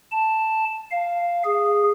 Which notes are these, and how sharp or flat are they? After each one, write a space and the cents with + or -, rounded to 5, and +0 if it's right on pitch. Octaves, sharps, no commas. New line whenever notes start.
A5 +0
F5 -5
G#4 -10